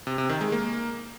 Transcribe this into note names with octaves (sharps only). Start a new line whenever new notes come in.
C3
C3
D#3
G#3
A#3